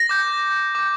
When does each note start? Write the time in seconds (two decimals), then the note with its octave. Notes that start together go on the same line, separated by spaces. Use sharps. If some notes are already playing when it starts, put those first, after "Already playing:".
Already playing: A#6
0.09 D6 G6
0.75 D6 G6